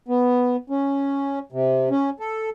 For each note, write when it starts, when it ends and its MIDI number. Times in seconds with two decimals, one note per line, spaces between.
0.08 0.56 59
0.70 1.39 61
1.52 1.89 48
1.90 2.10 61
2.20 2.50 69